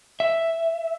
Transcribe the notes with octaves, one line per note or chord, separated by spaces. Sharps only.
E5